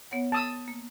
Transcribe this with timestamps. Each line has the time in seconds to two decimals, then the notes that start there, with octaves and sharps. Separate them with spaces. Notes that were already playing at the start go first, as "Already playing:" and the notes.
0.11 B3 C#5 F#5
0.32 A5 D#6 E6
0.68 A#3